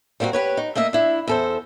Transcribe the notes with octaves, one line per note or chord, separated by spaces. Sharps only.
G3 A#3 C4 E4 F#4
G4 B4 C#5
D#4
A3 A#3 D#5 E5
D4 E4
E2 A4 C5